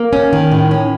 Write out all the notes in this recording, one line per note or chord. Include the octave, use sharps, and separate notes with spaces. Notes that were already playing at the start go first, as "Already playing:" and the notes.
Already playing: A#3
C#4
D#3
A2
C#4